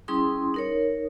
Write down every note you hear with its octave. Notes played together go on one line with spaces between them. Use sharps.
G3 C#4 E4 G#4 C6 D#6
D#4 A#4 C#5